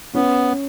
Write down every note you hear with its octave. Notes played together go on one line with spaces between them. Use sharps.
B3 C#4